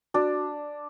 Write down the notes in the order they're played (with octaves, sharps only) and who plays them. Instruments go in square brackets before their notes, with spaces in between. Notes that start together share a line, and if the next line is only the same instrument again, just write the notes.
[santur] D4 [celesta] F#4